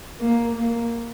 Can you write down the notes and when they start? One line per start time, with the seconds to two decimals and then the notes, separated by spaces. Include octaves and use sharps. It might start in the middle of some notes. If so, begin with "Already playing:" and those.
0.20 A#3
0.55 A#3